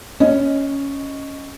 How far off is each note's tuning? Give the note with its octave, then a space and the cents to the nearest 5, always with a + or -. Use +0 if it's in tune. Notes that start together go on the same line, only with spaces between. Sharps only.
C#4 +0 D#5 +0